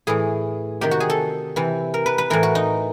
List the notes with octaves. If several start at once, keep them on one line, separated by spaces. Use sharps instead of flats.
A2 E3 G#4
C3 D#3 G4
F#4
G#4
A4
C3 E3
A#4
B4
B4
A2 E3 A#4
F#4
D#4